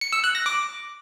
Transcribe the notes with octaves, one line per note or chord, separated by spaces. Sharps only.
C#7
E6
F#6
A#6
D6